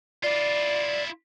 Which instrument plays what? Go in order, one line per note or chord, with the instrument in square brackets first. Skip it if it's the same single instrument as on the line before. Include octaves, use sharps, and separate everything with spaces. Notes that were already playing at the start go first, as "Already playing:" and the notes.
[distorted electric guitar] E4 F4 [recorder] D5